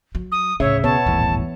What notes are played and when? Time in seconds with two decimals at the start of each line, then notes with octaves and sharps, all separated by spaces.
0.15 F#3
0.31 D#6
0.60 D1 C#3 A3 C#5 E5
0.83 B2 B3 C#5 A5
1.06 D#1 G#1 A2 E3